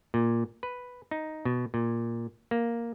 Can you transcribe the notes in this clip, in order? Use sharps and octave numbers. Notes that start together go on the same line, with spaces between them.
A#2
B4
D#4
B2
A#2
A#3